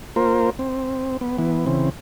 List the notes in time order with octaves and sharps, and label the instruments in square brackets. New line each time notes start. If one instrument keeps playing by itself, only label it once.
[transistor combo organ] A#3 F4 A#4 C5
C4
B3
E3 B3
C#3 E3 C4